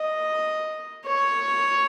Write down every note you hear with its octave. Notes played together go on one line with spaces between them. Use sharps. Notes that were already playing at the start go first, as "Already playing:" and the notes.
Already playing: D#5
C#5